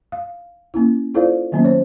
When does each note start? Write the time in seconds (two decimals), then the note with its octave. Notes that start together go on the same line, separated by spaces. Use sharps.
0.12 F5
0.74 A#3 C#4 E4
1.15 E4 F4 A4 C5 D5 F5
1.52 D#3 F#3 A#3 B3 C#4
1.64 C5 C#5